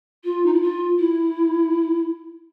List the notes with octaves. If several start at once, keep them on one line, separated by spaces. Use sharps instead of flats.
F4
D#4
E4
F4
E4